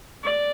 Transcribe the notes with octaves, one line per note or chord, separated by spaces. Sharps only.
D5